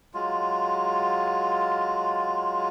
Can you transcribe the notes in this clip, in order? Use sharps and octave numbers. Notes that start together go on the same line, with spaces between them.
F#3 G#3 F4